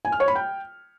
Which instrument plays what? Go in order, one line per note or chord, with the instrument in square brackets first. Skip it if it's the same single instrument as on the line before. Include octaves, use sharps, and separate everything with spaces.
[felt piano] G#5
F6
C#5
B5
G5